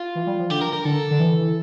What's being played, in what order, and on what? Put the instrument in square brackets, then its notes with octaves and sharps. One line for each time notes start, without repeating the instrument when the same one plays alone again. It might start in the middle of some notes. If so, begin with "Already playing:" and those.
Already playing: [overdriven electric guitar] F4
[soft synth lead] E3
G3
F3
[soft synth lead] D3 [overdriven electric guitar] G4
[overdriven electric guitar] A#4
A#4
[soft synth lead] D3 [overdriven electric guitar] A4
[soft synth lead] D3
E3